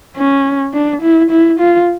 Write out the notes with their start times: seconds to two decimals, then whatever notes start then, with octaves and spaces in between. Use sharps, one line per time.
0.16 C#4
0.74 D4
1.02 E4
1.31 E4
1.60 F4